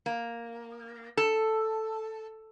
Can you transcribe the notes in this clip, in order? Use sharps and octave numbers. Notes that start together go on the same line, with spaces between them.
A#3
A4